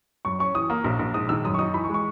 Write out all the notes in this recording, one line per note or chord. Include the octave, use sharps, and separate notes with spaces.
F#2 C#6
C#4 C#6
E3 D#6
A#3
A#1
A#1
G#2 D#6
D#3 E6
F#2 D#6
C#6
D#4 D#6
E3 B5
C#6
G#3
C#6